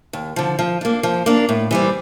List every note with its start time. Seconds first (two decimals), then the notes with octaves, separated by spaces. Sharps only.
0.13 D#2
0.36 D3 F3
0.59 F3
0.81 A#3 D4
1.03 F3
1.26 A#3 D4
1.49 A2
1.71 E3 G3 C4